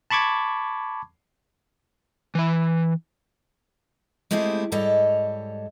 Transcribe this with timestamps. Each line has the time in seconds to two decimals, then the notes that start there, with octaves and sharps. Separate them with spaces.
0.10 A5 B5 C#6 D6 G#6
2.35 E3 E5
4.31 G#3 A3 C4 E4 G4 G#4
4.72 G#2 G3 A4 C#5 D#5